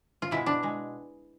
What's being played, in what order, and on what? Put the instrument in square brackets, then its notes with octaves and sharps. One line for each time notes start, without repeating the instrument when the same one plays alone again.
[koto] F4
B2 G#3 E4
D4
B2 G#3